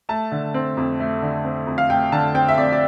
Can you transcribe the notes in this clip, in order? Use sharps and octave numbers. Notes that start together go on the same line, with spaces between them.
A3 A5
D3
C4
F2
A3
D3
C4
F2
F5
A3 G5
D3 A5
C4 G5
E5
F2 D5
D5